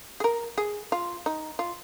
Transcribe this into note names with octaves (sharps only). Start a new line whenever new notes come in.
G#4
A#4
G#4
F4
D#4
F4